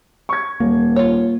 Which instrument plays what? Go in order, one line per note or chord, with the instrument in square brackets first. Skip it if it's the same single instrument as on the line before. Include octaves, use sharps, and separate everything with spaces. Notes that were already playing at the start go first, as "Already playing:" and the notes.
[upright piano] C#6 G#6
[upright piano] D#1 [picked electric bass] A#3
[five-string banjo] F4 C#5